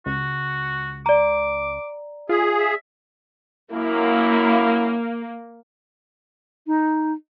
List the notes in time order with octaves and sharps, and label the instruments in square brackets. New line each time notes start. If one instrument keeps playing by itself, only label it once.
[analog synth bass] C#2 [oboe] F#4
[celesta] D5 A#5 [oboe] D6
[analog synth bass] F4 [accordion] G#4 [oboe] E5
[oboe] E5
[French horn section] F#2 E4 [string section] A#3
[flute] D#4